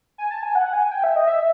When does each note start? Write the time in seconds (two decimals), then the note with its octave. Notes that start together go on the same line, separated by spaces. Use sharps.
0.18 G#5
0.31 A5
0.43 G#5
0.55 F#5
0.73 G#5
0.92 G5
1.04 E5
1.16 D#5
1.28 E5